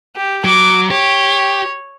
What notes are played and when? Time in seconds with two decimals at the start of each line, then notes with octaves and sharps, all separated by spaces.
0.16 G4
0.45 F#3 D6
0.91 G4 C#5